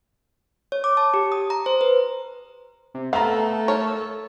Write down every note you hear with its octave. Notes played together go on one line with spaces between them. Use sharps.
C#5
D6
A5
G4
D#6
A#5
C5
B4
C3
A3 B3 A4 F5 A#5
A#4 C#5